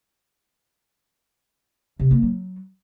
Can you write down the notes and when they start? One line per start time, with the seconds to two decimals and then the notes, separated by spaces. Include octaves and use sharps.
1.99 C3
2.11 A#3
2.22 F#3